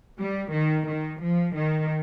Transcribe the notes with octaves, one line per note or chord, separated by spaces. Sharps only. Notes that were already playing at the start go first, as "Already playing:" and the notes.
G3
D#3
D#3
F3
D#3